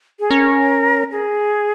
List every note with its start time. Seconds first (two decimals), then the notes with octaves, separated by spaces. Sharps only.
0.20 G#4
0.30 C#4 A#4
1.12 G#4